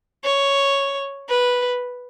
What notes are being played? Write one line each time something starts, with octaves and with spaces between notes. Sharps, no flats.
C#5
B4